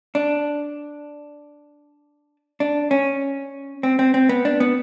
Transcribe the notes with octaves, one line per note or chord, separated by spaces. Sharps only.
D4
D4
C#4
C4
C4
C4
B3
D4
B3